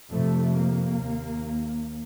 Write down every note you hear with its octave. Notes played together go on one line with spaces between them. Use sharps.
F2 C3 A3
A#3
D#2